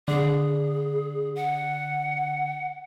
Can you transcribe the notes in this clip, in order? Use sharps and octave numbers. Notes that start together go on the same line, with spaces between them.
D3 G#4
F#5